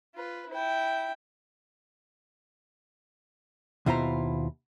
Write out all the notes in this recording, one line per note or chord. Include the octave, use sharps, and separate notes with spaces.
F4 B4
E4 G5
D#2 B2 E4 F4 C5 A#5